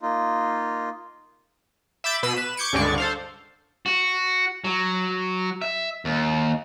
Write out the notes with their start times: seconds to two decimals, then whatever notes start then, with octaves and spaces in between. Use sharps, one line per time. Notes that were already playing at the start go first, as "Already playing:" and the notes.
0.02 A#3 D#4 F4
2.04 E5 B5 D6 G6 A6
2.23 B2 B5 E6 C7 D#7
2.36 B4 E7
2.57 C#6 D6 G6 G#6 C#7 D7
2.73 C#2 G2 D3 G#3 D5 C#6
2.98 A4 C5 F5
3.86 F#4
4.64 F#3
5.62 E5
6.05 D#2